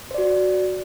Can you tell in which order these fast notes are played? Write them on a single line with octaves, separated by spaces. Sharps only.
C5 D5 F#4